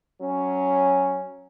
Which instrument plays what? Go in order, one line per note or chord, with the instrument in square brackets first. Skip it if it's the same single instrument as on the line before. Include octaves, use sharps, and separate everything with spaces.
[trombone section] F#3 C#4